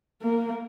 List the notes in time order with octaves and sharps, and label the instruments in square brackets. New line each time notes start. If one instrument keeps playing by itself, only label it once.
[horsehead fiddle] A#3